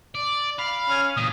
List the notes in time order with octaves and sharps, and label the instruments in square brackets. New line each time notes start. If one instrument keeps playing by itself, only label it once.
[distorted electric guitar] D5
[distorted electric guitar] F5 [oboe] B5
[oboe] C#4
[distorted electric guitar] A#2 E3 [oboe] D#6